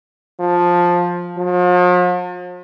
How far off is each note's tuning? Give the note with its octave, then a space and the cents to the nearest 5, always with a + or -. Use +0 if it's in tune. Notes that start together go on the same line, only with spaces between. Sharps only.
F3 +10
F3 +45